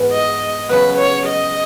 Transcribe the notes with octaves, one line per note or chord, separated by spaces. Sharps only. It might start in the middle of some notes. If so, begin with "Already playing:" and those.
Already playing: G#2 E3 B3
D#5
C#3 F#3 B3 B4
C#5
D#5